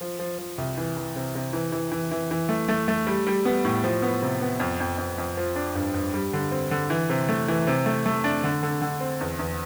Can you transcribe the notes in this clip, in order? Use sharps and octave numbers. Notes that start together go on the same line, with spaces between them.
F3
F3
F3
C2
E3
E3
C3
C3
E3
E3
E3
E3
E3
A3
A3
A3
G3
G3
B3
A2
F3
B3
C3
B3
F2
F2
F2
F2
F3
D4
G2
G2
G3
D3
C4
D3
E3
C3
A3
E3
C3
A3
A3
D4
D3
D3
D3
C4
E2
E2